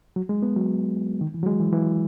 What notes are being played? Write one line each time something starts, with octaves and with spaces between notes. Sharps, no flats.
F#3
G#3
B3
F#3
D#3
E3
F#3
G#3
E3
E3